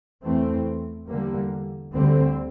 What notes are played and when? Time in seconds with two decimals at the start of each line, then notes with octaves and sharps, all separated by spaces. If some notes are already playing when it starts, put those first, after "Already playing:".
0.23 E2 E3 A3 C4
1.08 E2 D3 G3 A#3
1.94 D2 D3 G3 C4